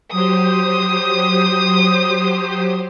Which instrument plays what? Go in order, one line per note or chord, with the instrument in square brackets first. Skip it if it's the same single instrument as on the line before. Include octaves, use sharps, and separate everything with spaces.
[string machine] F#3 G4 C5 [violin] D#6